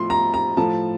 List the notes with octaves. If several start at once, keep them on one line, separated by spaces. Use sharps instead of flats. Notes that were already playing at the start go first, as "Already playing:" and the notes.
Already playing: A2 F3 C6
A#5
A#5
A2 F3 A5